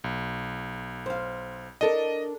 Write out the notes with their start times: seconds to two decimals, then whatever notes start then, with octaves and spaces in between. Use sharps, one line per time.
0.04 B1
1.06 C5 F5
1.81 D4 A4 A#4 D#5